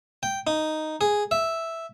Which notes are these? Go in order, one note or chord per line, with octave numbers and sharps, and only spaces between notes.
G5
D#4
G#4
E5